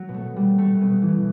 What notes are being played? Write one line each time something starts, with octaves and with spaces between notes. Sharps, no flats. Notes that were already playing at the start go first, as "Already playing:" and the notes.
Already playing: F#3
B2
A3
B2
G3
B2
B2 A3
B2
B3
B2
E3
B2